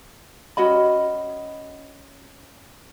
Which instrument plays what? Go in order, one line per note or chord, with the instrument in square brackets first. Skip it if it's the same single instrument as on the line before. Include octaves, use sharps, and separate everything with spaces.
[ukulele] C#4 F#4 D#5 B5